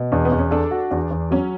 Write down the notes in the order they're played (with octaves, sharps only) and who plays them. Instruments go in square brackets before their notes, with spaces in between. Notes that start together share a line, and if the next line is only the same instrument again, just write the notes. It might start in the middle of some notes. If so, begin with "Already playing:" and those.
Already playing: [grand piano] B2
[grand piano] E2 [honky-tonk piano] D4
[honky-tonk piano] B3
[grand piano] E2
[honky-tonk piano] C#4
[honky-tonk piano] D4 [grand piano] A4
[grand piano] F#4
[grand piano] E2 [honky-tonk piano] D4
[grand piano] E2
[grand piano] F#3 [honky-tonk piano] C#4